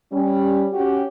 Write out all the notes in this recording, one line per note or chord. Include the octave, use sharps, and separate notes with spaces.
G3 C#4
C#4 F#4 G4